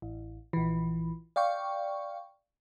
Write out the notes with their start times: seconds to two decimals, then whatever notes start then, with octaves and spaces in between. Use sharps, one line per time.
0.02 A1
0.53 A#1 E3
1.36 D5 F5 G5 C#6